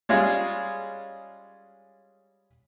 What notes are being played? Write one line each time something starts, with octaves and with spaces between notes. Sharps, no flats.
G3 G#3 C#4 F4 G#4